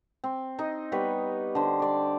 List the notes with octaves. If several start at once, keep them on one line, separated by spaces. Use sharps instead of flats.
C4
D#4 D#5
G3 B3 B4 C#5
D3 C5
D5 D6